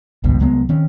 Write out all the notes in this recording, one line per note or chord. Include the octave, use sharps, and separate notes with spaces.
G#1 C#2 G2 B2
C2 F#3 G#3 B3
D#3 C4 C#4